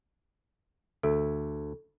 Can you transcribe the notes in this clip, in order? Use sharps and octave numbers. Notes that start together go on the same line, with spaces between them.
D2 A4 E5